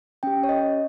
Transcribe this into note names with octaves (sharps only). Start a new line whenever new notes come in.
C#4 G4 G5
C#5
D#5